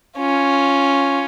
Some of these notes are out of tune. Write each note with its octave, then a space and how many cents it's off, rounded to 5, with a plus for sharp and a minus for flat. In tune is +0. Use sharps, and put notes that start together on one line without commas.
C#4 +0 F4 +0